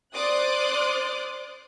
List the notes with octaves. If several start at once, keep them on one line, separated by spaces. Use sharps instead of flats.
C5 D5 C6 D6 D#6 F#6